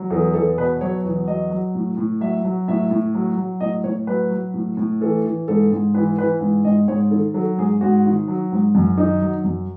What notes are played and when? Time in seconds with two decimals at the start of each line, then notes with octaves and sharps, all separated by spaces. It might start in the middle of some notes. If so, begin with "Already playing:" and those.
Already playing: F#3
0.10 E2 A4
0.34 E2 A4
0.58 B2 B4
0.81 F#3 C#5
1.04 E2
1.28 F#3 D#5
1.50 F#3
1.75 A2
1.97 A2
2.20 F#3 E5
2.45 F#3
2.68 A2 E5
2.91 A2
3.14 F#3
3.38 F#3
3.60 A2 D#5
3.84 A2 C#5
4.07 F#3 B4
4.31 F#3
4.54 A2
4.77 A2
5.01 E3 A4
5.25 E3
5.48 G#2 A4
5.72 G#2
5.94 E3 B4
6.18 E3 B4
6.41 G#2
6.65 G#2 D#5
6.88 G#2 C#5
7.11 D#3 A4
7.34 F#3 A4
7.58 G#2 G#4
7.81 G#2 F#4
8.05 D#3
8.28 F#3
8.52 G#2
8.75 F#2
8.98 D#3 D#4
9.22 F#3
9.44 F#2